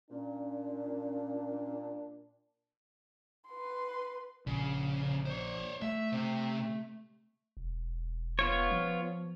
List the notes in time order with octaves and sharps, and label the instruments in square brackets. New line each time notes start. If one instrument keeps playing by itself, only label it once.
[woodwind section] A#2 [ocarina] C#4 [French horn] D4
[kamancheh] B4 C6
[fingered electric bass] A#1 [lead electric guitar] C#3
[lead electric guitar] C5 C#5
[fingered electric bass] A3 [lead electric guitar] E5
[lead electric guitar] C3
[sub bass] E1
[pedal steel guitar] B3 F4 C#5
[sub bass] F3